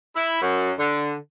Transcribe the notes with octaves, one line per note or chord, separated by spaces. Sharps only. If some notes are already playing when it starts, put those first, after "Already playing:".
E4
F#2
D3